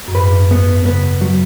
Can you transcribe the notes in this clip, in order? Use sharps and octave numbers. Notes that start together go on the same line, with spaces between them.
F#2
G#2 B4
B3
C#3 B3
F#3